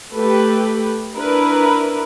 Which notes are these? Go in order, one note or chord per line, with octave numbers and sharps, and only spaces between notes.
A3 G4 A4 B4
D4 E4 A#4 B4